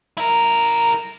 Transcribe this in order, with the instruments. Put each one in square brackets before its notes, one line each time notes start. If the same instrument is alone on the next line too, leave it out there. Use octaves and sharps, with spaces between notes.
[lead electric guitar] E4 A#4